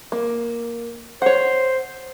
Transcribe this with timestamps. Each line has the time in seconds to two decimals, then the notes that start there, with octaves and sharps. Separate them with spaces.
0.12 A#3
1.22 C5 C#5 F#5